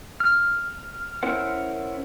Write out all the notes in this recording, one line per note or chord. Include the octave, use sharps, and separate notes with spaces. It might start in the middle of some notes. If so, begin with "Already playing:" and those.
F6
C#4 E4 A#4 C5 F#5